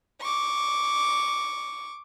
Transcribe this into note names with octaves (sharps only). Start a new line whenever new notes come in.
C#6 D6